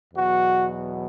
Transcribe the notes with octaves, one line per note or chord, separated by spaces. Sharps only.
E2 B2 F#3 F#4